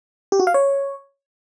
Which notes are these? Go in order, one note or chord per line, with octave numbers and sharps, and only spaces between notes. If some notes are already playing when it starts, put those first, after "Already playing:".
G4
F#4
F5
C#5